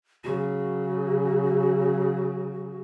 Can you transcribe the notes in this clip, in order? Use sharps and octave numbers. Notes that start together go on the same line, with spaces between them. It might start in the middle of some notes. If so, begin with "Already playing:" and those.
C#3 F#3 F#4